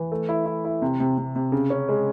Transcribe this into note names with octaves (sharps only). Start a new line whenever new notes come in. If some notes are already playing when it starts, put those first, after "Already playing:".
Already playing: E3
A3
E4
E4
E4
C3
C3
C3
C3
C#3
C#4
G#3